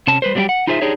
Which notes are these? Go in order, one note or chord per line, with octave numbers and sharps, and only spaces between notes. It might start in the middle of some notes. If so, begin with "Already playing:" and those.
C3 C#4 A5
G3 B4 C5
F#3 G3 A#3 D4 G4 G5
F#5
D#4 F4 G#4 C5 D#5 E5
D4 D#4 G4 G#4 C#5